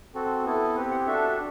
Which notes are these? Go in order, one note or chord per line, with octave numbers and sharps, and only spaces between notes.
C4 F#4 A4
B3 E4 A4
C4 G4 B4
F#5
D4 F#4 A4 E5